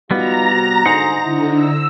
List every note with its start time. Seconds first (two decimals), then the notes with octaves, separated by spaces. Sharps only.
0.11 G3 B3 D#4 F4 F#4 A#5 A#6
0.52 C3 F#4
0.86 G#2 D3 D#4 C5 F#5 G#5
1.24 D3 E4
1.54 E6